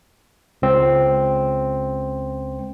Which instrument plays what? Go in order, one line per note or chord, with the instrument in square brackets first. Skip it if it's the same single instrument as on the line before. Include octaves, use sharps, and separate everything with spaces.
[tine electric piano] C#2 C4